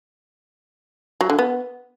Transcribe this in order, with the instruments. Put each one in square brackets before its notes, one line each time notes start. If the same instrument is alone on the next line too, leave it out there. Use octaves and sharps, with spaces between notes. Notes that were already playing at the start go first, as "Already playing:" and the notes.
[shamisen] F#3
D3
B3